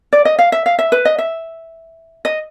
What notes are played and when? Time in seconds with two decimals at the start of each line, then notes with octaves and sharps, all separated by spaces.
0.13 D5
0.25 D#5
0.39 F5
0.52 E5
0.66 F5
0.79 E5
0.92 B4
1.05 D#5
1.18 E5
2.25 D#5